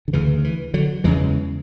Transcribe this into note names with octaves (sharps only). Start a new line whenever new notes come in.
D3
D2 C#3 E3
E3
D3 F#3
E2 C#3 E3 G#3